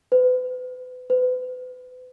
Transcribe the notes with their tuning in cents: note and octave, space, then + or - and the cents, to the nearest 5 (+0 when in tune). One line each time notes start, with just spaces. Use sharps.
B4 +35
B4 +35